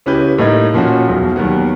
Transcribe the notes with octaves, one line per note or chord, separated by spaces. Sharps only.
C#2 C#4 E4 G4 B4 G6
A2 G3 A#3 D#4 D#5 G#6
A#2 F3 C#4 F#4
E1 B1 B2
D#2 F#3 G3 B3